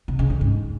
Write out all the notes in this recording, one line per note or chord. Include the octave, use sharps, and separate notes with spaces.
C3
C#3
F2
G#2